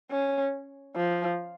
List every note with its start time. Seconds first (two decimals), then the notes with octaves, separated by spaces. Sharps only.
0.11 C#4
0.97 F3